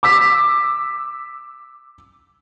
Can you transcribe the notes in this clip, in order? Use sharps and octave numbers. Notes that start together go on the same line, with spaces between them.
D6 E6 B6